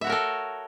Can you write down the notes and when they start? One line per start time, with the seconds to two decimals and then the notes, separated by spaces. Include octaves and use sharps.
0.01 E5
0.04 F#4
0.07 C#5
0.10 A#4
0.12 A4